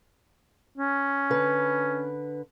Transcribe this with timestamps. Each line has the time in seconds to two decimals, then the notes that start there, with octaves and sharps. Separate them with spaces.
0.78 C#4
1.30 D3 B4